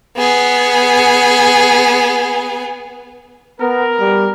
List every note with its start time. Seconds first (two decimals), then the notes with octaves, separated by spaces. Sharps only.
0.18 B3 G#4
3.60 B3 A#4
4.00 G3